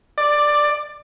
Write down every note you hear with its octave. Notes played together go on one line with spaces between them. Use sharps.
D5